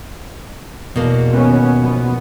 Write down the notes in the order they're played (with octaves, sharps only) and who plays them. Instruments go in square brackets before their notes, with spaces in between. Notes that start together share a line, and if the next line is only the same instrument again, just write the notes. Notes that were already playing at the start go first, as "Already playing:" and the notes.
[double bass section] E2 [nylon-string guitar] B2 A#3
[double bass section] D#2 B3 C#4
A#1 B3